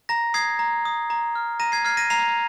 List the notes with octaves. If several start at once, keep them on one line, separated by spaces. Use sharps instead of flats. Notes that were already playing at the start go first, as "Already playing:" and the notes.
A#5 A#6
D#6 G#6 C7
A#5
D#6
A#5
F6
A#5 A#6 D#7
G#6 C7
F6 G#6 C7
A#6 D#7
A#5 C7 F7